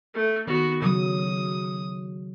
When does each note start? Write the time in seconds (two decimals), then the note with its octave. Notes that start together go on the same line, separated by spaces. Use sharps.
0.14 A3
0.47 D#3 B3 F#4
0.82 C#3 F#3 D#6